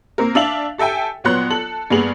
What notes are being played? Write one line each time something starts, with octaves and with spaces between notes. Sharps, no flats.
A#3 C4 A#4
D4 E5 F5 A5 F7 F#7
G4 A4 E5 G5 G#5
A#1 F#3 B3 C#5 C6 F#6
A4 F#7
G2 A#3 B3 G#4 F7 F#7